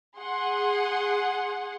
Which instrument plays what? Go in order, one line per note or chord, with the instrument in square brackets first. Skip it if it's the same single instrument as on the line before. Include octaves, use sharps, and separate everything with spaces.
[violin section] G#4 F#5 C6